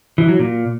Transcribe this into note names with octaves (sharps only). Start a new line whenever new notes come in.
E3
F#3
A#2